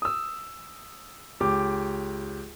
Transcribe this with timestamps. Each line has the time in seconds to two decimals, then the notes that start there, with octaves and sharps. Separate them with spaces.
0.02 D#6 E6
1.40 C#2 G4 D6